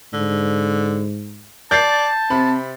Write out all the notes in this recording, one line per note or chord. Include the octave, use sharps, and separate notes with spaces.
G#2 D3
D5 A5 G6 A6 C7
C3 C4 B5